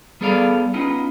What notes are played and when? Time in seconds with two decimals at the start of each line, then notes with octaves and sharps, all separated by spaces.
0.21 G3 B3 G#4 A4 D5 F5
0.74 B3 C#4 D#4 F4